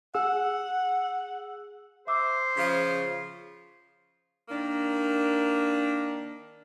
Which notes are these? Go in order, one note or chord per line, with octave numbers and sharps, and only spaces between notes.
G#4 F#5 E6
C5 E5 D6 E6
C#3 F3 B6
D#3 A#3 D4